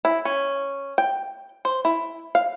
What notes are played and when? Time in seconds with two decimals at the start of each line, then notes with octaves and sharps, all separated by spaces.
0.05 E4
0.25 C#4
0.98 G5
1.65 C5
1.85 E4
2.35 F5